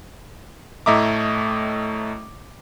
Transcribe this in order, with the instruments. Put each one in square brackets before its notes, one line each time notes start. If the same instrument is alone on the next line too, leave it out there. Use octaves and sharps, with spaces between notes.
[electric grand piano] A2 A3 D#5 E5 A#5 D6